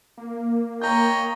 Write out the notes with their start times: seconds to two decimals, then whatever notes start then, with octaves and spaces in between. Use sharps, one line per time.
0.17 A#3
0.82 C#5 D#5 G5 A#5 G6